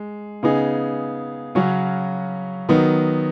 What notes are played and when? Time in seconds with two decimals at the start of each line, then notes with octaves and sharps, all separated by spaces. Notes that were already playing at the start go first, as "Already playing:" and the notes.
Already playing: G#3
0.43 C#3 B3 D#4 G#4
1.55 C#3 F#3 C#4 F#4
2.69 D#3 F#3 B3 D#4